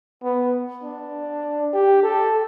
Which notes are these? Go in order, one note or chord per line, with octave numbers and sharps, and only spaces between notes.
B3
D4
G4
A4